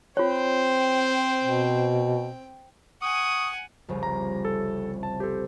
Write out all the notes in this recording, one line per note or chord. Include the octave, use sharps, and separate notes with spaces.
C4 F4 C5 C#5 G5
B2
F#5 G#5 C#6 D#6
F1 C2 C#3
A#5
A4
A5
G4 A4 C5